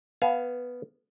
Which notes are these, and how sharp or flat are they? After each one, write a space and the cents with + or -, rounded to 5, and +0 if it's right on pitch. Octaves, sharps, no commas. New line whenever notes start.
B3 +0 F5 -10 G#5 +30